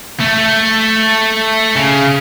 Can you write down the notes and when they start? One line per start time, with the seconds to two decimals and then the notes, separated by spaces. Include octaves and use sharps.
0.21 A3
1.76 C#3